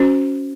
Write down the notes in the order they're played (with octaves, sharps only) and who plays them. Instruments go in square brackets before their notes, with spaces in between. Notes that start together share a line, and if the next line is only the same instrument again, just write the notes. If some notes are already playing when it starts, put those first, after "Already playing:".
Already playing: [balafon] C#4 F#4 C5